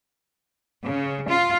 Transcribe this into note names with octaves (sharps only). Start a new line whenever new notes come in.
C#3
F4